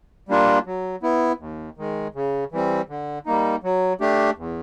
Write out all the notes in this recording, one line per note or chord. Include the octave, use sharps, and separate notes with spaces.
G3 A#3 D4 F4
F#3
B3 E4
D#2
D#3 G#3
C#3
E3 G3 C4
D3
G3 A#3 D#4
F#3
A3 D4 G4
E2